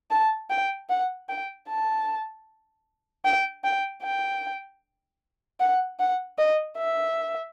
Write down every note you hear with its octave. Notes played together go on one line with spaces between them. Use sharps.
A5
G5
F#5
G5
A5
G5
G5
G5
F#5
F#5
D#5
E5